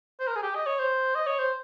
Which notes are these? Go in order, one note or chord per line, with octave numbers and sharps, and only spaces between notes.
C5
A#4
G#4
G4
D#5
C#5
C5
D#5
C#5
C5